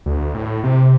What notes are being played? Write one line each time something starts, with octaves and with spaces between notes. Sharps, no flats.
D2
A2
C3